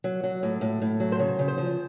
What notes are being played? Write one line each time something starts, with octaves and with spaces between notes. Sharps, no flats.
F#3
F#3
A2
A2
A2
F#3
C5
C#3 C#5
C#3
C5
F3